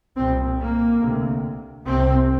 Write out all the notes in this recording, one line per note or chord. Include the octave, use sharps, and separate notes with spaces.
C2 A#2 C4
A#3
D2 C3
C2 C3 C4